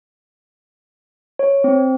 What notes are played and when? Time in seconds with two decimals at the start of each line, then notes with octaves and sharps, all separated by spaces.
1.39 C#5
1.64 C4